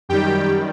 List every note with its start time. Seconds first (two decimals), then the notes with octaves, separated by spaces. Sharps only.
0.09 F#2 D#3 G3 G4 G5